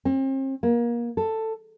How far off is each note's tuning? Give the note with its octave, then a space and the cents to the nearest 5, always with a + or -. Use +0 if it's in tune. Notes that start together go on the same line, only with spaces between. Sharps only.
C4 +40
A#3 +25
A4 +10